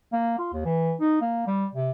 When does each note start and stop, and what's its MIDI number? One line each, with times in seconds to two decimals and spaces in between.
0.13 0.37 58
0.39 0.51 65
0.53 0.63 39
0.65 0.93 52
1.00 1.18 63
1.21 1.45 58
1.47 1.66 55
1.75 1.91 48